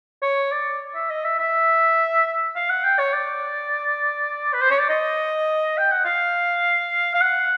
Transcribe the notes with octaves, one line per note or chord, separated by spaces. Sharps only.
C#5
D5
E5
D#5
E5
E5
F5
F#5
G5
C#5
D5
B4
C5
C#5
D5
D#5
G5
F#5
F5
F5
F#5